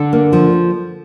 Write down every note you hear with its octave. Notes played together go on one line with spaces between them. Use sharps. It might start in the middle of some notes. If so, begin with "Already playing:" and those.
Already playing: D3 A4
A#3
F3